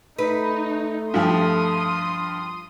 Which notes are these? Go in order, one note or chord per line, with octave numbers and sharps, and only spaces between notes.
A3 D#4 B4
G2 F3 G4 C6 D#6